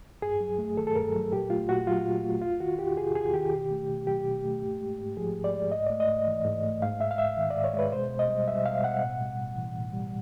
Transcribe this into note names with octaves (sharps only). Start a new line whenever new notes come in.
G2 G#4
F#3
A3
D#3 A4
A4
G2 A#4
F#3
A#2 G4
A3 F4
A#2 F#4
F#3 F4
A#2
A3
E2 F4
D#3 F#4
E2 G4
C3 G#4
E2 G#4
D#3 G4
B2
A3
B2
F#3 G4
B2
A3
G#2
G#3
G#2
F3 G#4
G#2
D5
G#3
G#2 D#5
A3 D5
D#5
G#2
E3
G#2
A3
G#2 F5
G#3 E5
F5
G#2 E5
D#3
D5
G#2
C#5
G#3 B4
B2 C5
B2
D#5
G3
G3 E5
B2 F5
B2 F#5
A2
G3
A2
E3
A2
G3